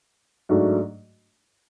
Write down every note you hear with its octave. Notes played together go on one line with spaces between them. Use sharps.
G#2 F#3 A3 D4 F#4